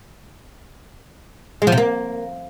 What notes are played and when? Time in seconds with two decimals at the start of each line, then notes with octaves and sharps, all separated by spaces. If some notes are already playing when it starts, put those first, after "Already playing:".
1.62 G#3
1.67 F3
1.72 C3
1.78 A#3